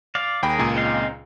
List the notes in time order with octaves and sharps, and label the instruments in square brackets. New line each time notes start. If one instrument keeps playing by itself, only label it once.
[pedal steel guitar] D5 F5
[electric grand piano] D#2 G5 B5 [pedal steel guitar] G#4 A#4
[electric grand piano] C#2 A#2 G#5
[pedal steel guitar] C4 D#4 F5